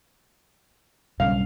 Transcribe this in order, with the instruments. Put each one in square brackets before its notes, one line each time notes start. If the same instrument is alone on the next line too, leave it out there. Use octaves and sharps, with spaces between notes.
[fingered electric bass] B1 G2 C#3 [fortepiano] F5